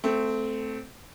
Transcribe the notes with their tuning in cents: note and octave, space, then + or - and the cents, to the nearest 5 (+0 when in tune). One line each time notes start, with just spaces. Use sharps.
A3 +0 C4 -15